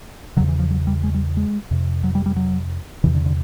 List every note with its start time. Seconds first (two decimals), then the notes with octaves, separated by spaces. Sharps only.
0.37 E2 C#3 F#3
0.48 E3
0.59 F3
0.70 F#3
0.87 G3
1.03 G#3
1.14 G3
1.37 G#3
1.71 F2 C3
2.04 F#3
2.15 G3
2.26 G3
2.36 F#3
3.04 E2 C3 E3
3.15 D3
3.26 D3